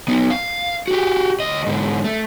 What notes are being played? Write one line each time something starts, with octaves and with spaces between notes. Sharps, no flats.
B3 D#4
F5
F#4 G4
D2 D#5
G#2 D3
A3